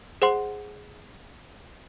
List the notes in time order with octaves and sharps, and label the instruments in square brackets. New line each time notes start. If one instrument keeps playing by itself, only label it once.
[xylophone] G#4 C5 F#5 C6